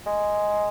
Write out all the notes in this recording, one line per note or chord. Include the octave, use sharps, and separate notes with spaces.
G#3